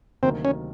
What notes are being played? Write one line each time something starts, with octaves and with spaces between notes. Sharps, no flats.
D2 C3 D#3 F#3 A#3 C4
C#4